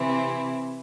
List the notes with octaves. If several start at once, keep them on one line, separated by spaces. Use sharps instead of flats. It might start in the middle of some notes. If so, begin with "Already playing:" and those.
Already playing: C3 E3 C4 E4